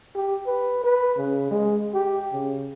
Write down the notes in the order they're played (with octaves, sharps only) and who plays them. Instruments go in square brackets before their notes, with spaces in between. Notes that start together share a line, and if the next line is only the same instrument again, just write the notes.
[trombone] G4
B4
B4
C#3
G#3
G4
C#3